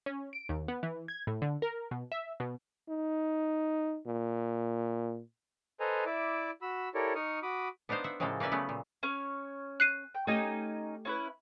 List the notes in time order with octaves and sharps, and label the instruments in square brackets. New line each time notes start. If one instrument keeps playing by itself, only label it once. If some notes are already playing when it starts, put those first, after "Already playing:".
[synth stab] C#4
D7
D#2
B3
E3
G#6
A2
D3
A#4
B2
E5
B2
[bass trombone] D#4
A#2
[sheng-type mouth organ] A4 B4 C5 D#5 G#5 A#5
E4 D5 E5 D6
F#4 B5 E6
E4 G4 A4 A#4 C#5 D5
D#4 C#6 D#6 F6
F#4 B5 D6 D#6
[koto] B3 D4 D#4 C5 F5
E5 F#5
A2 C#3 F3 G#3 A#3 A4
A#3 C#4 B4 D5 E5
C#3 F#3 A3 B3
A#2
[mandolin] C#4 C#5
[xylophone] F#6 C7 D#7
[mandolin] G5
[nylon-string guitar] A3 G4 [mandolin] C#4 D#4 G#5
[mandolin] C#4 E4 B4